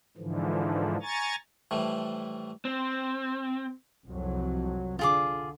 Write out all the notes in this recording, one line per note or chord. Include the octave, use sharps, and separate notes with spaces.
G#2 D3 E3 F3
G#5 A#5 C#6 A6
A2 E3 F3 G3 A3
C4
C2 F2 F#3
D3 F4 G#4 D6